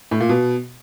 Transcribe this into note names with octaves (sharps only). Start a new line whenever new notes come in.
A2
A#2
B2